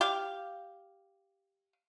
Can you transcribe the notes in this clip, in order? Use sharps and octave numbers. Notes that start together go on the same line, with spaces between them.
G4 F5